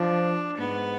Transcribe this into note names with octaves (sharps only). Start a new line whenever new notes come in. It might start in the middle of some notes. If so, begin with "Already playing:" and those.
Already playing: F3 D4
G#2 B3